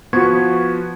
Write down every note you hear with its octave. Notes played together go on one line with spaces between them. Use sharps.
F3 B3 F#4 B4 C#6 G#6